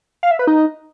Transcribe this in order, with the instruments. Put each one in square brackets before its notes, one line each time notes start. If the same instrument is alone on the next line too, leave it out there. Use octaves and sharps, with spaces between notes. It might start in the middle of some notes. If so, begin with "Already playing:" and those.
[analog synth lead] F5
E5
B4
D#4